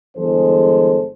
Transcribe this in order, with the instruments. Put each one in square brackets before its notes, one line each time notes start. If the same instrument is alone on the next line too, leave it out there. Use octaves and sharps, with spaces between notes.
[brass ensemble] G1 E3 G#3 G#4 A4 C5